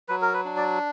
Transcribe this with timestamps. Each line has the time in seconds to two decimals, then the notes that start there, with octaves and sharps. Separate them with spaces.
0.09 F#3 B4
0.22 A#4
0.34 B4
0.45 D4
0.57 D5